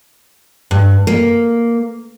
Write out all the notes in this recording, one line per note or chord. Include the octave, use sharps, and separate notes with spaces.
G2
A#3